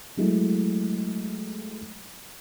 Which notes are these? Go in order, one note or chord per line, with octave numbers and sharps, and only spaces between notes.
F#3 G#3 A3 E4